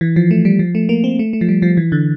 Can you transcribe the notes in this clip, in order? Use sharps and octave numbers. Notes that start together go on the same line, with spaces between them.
E3
F3
A3
G3
F3
A3
A#3
C4
A3
A3
F3
G3
F3
E3
D3